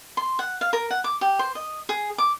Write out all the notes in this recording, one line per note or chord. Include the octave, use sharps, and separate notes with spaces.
C6
F#5
F5
A#4
F#5
D6
G4
C5
D#5
G#4
D6